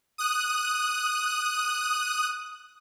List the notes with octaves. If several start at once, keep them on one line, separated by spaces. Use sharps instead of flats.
D#6 F#6